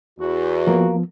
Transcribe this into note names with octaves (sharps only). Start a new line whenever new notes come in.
E2 F#4
F3 A#3 B3